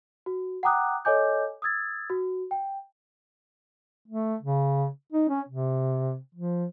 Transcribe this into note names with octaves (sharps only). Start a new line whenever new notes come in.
F#4
F#5 G5 A#5 D6 D#6 F#6
A4 C#5 D#5 G#5 D6 G6
D#6 E6 G#6 A6
F#4
G5
A3
C#3
D#4
C#4
C3
F3